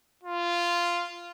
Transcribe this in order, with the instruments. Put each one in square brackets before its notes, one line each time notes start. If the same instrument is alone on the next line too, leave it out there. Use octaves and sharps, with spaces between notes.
[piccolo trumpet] F4